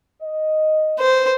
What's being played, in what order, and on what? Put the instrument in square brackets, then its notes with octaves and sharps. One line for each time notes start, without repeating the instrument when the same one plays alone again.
[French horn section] D#5
[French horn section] B4 [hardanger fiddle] C5